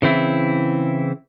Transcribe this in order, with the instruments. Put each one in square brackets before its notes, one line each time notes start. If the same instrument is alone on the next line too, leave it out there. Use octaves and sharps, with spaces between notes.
[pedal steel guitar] C#3 E3 C4 E4